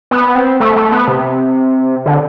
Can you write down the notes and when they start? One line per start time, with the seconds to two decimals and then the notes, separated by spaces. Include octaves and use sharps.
0.11 B3
0.35 C4
0.60 A3
0.76 A3
0.92 B3
1.08 C3
2.06 D3